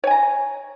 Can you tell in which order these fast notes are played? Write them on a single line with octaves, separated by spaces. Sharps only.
C#5 G#5 A#5